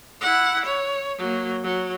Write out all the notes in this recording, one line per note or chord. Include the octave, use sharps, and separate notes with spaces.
E4 F#5
C#5
F#3 A#3
F#3